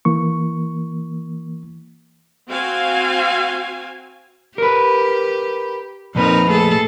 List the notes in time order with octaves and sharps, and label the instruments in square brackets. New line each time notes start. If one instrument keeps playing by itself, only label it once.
[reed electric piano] E3 A#3 C#6
[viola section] C4 F#4 F5 G#5
[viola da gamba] G4 [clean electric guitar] A#4 B4
[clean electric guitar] F2 A#2 B4 [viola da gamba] C4 D#4 A#4
[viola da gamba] A3 G#4 A4